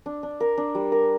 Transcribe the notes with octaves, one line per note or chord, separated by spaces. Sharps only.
D4
D4
A#4
D4
G3
A#4